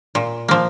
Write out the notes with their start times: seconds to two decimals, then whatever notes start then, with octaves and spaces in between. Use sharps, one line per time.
0.15 A#2
0.48 F3 A#3